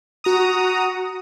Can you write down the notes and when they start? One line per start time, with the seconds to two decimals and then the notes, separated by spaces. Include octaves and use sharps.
0.24 F#4 A#5 D#6